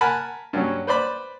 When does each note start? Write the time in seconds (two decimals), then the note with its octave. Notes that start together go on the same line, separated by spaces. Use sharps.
0.01 A#4 F#5 G#5 A5 B5
0.53 G2 F#3 C#4
0.87 B4 C5 D5 B5